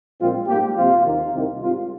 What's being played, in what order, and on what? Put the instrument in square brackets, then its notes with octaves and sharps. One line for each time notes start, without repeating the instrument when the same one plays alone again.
[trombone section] A#1 A#2 F3 G#3 C4 F4
G#2 G3 A#3 G4
F2 C3 F3 C4 F4
D#2 D#3 A#3
C2 C3 D#3
G#2 G3 C4 F4